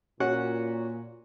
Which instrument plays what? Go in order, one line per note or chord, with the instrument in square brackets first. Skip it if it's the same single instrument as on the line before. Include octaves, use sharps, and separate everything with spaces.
[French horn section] A#2 [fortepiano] C#4 F#4 F#5